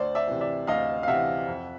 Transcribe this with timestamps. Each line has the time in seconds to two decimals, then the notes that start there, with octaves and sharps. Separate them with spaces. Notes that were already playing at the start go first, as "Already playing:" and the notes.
Already playing: D2 C5 D5
0.15 D5 E5
0.28 C3 E3
0.41 D5 E5
0.67 D2 D#5 F5
1.03 F5
1.08 C3 E3 E5 F#5
1.47 F2